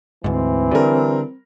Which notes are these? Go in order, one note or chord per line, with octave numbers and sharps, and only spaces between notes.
D2 G#2 E3 C4
D3 G3 A#4